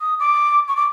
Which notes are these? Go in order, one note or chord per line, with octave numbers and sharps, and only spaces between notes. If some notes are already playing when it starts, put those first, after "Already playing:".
D#6
D6
C#6
D6